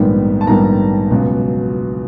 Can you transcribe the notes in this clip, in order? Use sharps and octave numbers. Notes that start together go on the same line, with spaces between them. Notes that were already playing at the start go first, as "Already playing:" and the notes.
Already playing: A#1 G#2 D#3 G3 B3
A5
A#1 G#2 D#3 G3 B3 A#5
C#2 B2 F#3